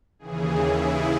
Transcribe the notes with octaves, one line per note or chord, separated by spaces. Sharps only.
D#2 C#3 E3 G#4
E4